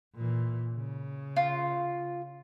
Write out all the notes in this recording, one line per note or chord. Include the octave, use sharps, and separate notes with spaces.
A#2 E3
C#3
F4